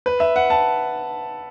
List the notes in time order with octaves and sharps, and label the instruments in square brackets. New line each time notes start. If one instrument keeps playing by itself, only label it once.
[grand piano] B4
E5
F#5
A5